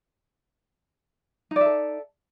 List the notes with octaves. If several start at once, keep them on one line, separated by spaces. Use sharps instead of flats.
D#4 A4 D5 E5